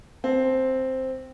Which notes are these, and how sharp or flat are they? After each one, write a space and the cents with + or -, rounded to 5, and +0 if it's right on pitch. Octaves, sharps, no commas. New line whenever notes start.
C4 +0 A5 -25